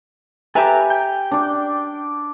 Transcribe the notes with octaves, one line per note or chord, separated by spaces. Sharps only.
G4 A4 B4 E5 G#5 A#5
G5
D4 D6